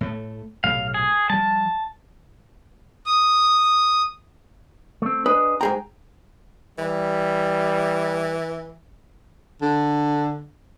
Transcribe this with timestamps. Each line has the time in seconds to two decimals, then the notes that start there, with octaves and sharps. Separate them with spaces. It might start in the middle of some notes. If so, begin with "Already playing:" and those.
0.01 A2 A3
0.64 B1 A2 C3 F5
0.94 G#4
1.30 F3 G3 A5
3.06 D#6
5.02 A3 C4
5.26 D4 G#4 B4 D#5
5.61 G#2 G#4 G5 A#5
6.79 E3 G3
9.62 D3